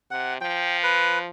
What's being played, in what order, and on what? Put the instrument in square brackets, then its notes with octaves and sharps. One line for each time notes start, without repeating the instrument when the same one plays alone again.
[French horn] C3 [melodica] F#5
[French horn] F3 [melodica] G5
[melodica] B4